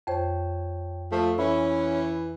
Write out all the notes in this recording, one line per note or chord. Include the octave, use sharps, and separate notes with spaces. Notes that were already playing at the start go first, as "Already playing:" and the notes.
F2 C5 C#5 G5 A5
F3 A3 A4
E3 C#4 E5 B5 E6